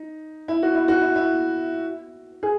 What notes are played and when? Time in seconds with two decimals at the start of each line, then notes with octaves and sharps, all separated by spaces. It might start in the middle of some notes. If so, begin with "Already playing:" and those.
Already playing: D#4
0.48 E4
0.63 F#4
0.75 E4
0.88 F#4
1.02 E4
1.16 E4
2.43 G#4